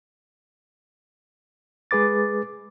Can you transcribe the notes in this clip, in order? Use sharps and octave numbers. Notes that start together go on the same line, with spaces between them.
G#3 G#4 B4 D6 A6